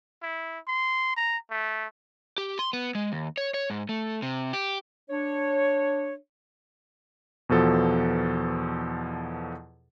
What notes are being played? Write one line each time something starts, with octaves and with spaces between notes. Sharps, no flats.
E4
C6
A#5
A3
G4
C6
B3
G#3
D#2
C#5
C#5
G#2
A3
C3
G4
D4 C#5
E2 B2 F3 A4